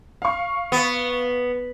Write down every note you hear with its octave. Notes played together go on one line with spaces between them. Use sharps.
F5 C#6
B3